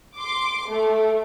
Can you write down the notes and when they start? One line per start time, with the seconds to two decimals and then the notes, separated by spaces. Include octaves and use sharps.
0.17 C6 D6
0.68 A3